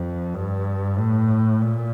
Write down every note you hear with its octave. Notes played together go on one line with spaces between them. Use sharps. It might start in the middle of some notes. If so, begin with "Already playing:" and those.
Already playing: F2
G2
A2
A#2